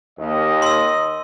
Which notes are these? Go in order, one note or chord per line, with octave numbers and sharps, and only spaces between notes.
D#2 D#5
C6 E6